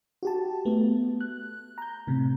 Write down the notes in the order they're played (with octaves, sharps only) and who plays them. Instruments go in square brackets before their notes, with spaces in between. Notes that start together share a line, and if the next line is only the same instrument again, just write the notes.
[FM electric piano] F#4 G4 A5
A3 B3
F#6
A#5 G6
A2 C3